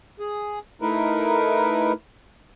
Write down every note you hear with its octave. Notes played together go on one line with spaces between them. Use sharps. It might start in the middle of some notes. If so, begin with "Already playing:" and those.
G#4
A3 D#4 E4 A#4 B4